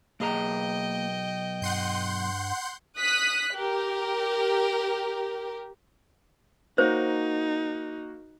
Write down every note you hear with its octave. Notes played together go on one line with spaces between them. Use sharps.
B1 A#3 G#4 D#5 G5 A#5
G2 F#5 C6 G6
D#6 F#6 B6
G4 A#4
A#3 D#4 F#4 C5 C#5